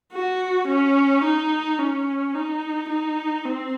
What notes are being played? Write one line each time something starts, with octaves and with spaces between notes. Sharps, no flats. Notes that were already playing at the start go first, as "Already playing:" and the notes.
F#4
C#4
D#4
C#4
D#4
D#4
C4